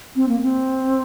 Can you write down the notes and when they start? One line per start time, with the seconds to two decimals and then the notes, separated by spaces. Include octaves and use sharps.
0.16 C4
0.28 A#3
0.41 C4